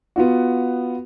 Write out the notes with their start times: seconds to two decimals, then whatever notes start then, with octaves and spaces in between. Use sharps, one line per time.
0.16 B3 F4 F#4